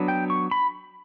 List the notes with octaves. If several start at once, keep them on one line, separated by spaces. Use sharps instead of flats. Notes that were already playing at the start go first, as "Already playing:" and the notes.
Already playing: F#3 B3 D4
G5
C#6
B5